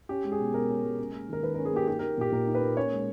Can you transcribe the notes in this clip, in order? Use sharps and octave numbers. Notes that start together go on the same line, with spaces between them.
C#4 G4
G#3
G#4
B2
B2 A#4
C#4
G#3
C#4
A#3
D#3 A#4
D#3 B4
A#4
C#4
G#4
A#3 G4
D#4 G4
A#4
A#3
A#2 G4
A#2 A#4
D#4
B4
A#3
C#4 C#5
G#3